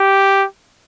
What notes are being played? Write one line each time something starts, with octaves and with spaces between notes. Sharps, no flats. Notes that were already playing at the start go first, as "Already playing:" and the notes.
Already playing: G4